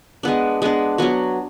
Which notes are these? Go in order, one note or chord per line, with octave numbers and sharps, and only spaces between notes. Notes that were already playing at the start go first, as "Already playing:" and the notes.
G#3 B3 D4
G#3 B3 D4
F#3 B3 F#4